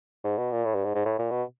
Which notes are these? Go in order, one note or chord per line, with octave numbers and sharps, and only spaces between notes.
G#2
B2
A#2
A2
G2
G#2
G#2
A2
A#2
B2